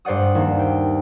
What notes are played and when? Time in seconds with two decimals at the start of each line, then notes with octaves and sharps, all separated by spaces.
0.05 G2 C5 D5 F#5 D#6
0.35 D#2
0.59 G5